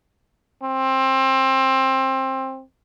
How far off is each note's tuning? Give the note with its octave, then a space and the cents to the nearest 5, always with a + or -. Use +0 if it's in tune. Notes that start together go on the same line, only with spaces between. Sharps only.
C4 +20